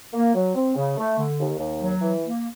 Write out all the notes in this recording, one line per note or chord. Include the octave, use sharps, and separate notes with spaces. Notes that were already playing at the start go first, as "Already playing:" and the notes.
A#3
F#3
C4
C#3
A3
D3
D#2
D#2
F#3
E3
A#3